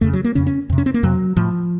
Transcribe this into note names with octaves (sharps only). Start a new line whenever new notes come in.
F2 C#3 A3
F#3
A#3
F2 C#3 C#4
C#4
F2 C3
C#4
C4
A#3
F2 C3 F#3
A2 F3